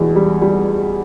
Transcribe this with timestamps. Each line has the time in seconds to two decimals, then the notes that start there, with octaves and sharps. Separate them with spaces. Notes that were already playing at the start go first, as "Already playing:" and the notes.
Already playing: E2 B2
0.15 G3
0.42 G3